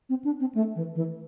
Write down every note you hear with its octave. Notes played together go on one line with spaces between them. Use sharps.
C4
D4
C4
A3
E3
E3